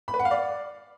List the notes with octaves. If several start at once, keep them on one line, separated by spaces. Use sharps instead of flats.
B5
B4
F#5
F5
D5